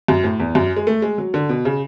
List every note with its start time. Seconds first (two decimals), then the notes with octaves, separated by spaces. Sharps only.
0.08 F#2
0.24 A2
0.40 E2
0.55 F#2
0.76 G#3
0.87 A3
1.02 G#3
1.18 F#3
1.34 D3
1.49 B2
1.65 C#3